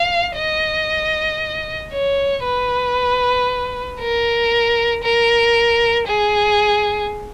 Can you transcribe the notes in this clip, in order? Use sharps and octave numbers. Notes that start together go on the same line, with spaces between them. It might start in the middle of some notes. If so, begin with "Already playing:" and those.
Already playing: F5
D#5
C#5
B4
A#4
A#4
G#4